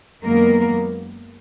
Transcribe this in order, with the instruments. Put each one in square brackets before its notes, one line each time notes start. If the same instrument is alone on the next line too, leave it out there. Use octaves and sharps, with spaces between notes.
[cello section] F#2 D#3 G#3 A#3 B3 A#4